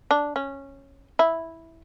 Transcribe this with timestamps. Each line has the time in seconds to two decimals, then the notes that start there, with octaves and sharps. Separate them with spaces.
0.11 D4
0.36 C#4
1.19 E4